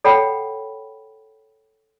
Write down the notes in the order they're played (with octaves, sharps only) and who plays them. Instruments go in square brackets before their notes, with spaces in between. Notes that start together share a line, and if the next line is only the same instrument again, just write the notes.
[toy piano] A4 C#5 F#5 G5 B5